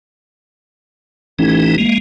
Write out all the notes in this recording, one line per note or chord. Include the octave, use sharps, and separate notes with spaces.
A1 E3 D#4
G#3 A#3